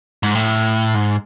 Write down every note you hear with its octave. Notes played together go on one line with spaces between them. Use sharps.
G#2
A2
G#2